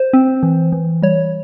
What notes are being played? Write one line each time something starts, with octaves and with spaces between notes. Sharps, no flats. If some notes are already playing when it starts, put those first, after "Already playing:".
Already playing: C5
C4
E3
E3
G3 C#5